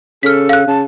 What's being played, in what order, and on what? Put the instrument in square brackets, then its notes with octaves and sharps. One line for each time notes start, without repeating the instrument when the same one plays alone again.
[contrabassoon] C#3 [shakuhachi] A4 [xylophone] F6 B6
[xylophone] F5 F#6
[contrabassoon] C#3 [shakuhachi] A5